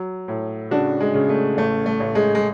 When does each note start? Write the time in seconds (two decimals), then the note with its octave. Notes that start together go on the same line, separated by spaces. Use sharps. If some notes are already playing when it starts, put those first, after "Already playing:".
Already playing: F#3
0.28 A2
0.71 C#3 D4 F#4
1.00 G#3
1.14 C#3
1.29 A3
1.57 A1 A3
1.86 A3
2.00 A1
2.15 G#3
2.35 G#3